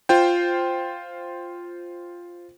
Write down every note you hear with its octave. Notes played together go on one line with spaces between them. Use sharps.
F4 C5 G5